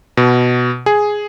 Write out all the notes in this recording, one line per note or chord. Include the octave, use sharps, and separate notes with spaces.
B2
G#4